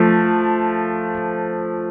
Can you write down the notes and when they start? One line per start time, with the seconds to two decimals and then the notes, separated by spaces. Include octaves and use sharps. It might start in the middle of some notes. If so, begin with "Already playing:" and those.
Already playing: F3 A3